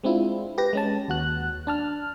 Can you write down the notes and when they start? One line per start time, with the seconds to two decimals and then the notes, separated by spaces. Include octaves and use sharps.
0.04 G#3 C4 D4 E4 F4
0.58 G4 B4 A#6
0.73 G#3 C#4 A5
1.08 D#2 F#4 F#6
1.67 D4 A5 F6